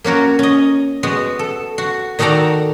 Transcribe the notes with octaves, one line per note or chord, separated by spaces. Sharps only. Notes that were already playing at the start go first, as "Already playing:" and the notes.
A#3 C#4 F#4 A#4
C#4 D#5
G#3 B3 F#4
A4
F#4
D#3 D#4 F#4 A4 D5 A#5